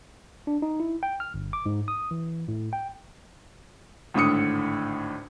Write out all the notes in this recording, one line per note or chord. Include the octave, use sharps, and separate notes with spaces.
D4
D#4
E4
G5
F6
G1
D6
G#2
D#6
E3
A2
G5
G#1 A2 D3 D#6 C#7